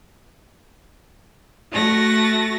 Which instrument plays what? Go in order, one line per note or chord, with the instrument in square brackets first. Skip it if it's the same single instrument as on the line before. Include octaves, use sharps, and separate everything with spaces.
[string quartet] A3 F#4 A6 A#6